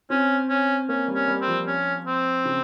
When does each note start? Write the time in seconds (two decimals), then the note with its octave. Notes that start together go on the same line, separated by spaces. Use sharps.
0.10 C4 C#4
0.49 C#4
0.89 A#3 C#4
1.08 G3
1.15 C#4
1.28 G3
1.41 C4
1.48 F3
1.67 C#4
2.06 C4
2.45 C#3